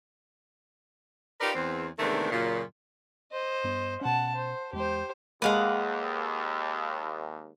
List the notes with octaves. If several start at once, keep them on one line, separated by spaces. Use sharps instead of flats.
D#4 F4 G4 A#4 B4 D5
E2 C4
E2 G#2 C3 D#3 A3 D4
F#2 A#2 C#3
C5 D#5
G2 B3
B2 C#4 F#5 A5
C5
E2 G#3 G4 C5
D#2 G#3 A#3 B4 F5 F#5